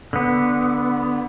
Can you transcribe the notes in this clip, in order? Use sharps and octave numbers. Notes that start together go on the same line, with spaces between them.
D3 B3